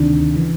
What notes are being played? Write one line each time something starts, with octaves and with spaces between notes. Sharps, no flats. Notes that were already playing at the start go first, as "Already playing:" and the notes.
Already playing: D2 C3 D#3 D4
C#3 E3